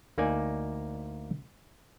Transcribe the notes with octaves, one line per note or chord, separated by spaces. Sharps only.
D2 A#3 D#4 D5 G#5